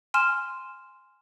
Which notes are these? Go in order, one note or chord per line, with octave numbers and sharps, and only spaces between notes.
G#5 C6 F6 E7